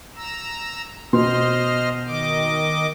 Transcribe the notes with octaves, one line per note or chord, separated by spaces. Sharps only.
A#5 E6
B2 C5 D#5 C6 F6
D#3 D#5 D6